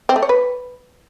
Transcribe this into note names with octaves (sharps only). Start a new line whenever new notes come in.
C4
A3
C#5
B4